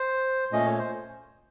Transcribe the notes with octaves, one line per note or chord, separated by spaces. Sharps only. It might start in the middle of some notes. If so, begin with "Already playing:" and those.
Already playing: C5
A#2 A3 C#4 D#5
C#5
C5